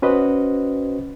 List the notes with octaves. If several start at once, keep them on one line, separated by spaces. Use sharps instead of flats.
C#4 F#4 B4 C5 D#5